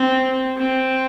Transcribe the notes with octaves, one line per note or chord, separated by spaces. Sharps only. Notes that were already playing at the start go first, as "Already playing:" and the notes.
Already playing: C4
C4